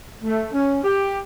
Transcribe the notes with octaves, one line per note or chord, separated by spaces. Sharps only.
A3
C#4
G4